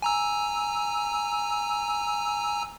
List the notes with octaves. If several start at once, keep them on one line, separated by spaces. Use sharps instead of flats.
G#5 A#5 E6